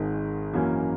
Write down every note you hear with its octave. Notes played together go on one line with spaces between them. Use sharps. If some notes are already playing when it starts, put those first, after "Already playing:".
Already playing: G#1 G#2 D#3 G#3
F#2 E3 A#3 C#4 F#4